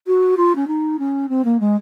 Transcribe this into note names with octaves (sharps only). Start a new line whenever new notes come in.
F#4
F4
C#4
D#4
C#4
C4
A#3
G#3